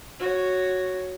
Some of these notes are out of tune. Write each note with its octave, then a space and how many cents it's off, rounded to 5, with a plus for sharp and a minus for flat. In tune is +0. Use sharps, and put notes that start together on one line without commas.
F#4 +0 C#5 +0